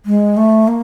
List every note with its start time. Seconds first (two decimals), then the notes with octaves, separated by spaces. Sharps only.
0.06 G#3
0.37 A3
0.68 A#3